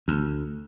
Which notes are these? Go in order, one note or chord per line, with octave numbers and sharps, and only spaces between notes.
D2